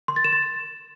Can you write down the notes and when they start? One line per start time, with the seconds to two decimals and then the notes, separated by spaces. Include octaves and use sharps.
0.08 C6
0.16 A6
0.24 E7
0.33 A6